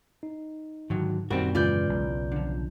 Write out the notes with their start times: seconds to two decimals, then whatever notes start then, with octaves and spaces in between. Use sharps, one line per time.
0.23 D#4
0.90 G#2 D3 D#3 F#3
1.30 F#2 A#2 D#3 G3 C4 F#4 A#4
1.55 D#2 G#2 C#3 E3 F4 B4 D5 G6
1.89 B1
2.32 D3 F3